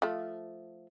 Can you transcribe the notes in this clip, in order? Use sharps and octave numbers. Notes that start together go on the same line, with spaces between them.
F3 A3